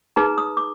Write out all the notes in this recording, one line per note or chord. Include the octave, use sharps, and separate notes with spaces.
D#4 G#4 B4 A#5
D#6
D6